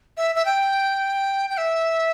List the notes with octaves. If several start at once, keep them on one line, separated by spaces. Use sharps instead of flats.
E5
E5
G5
G5
E5